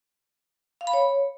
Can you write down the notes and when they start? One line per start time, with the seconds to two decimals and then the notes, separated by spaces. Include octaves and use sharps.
0.81 F5
0.87 B5
0.93 C#5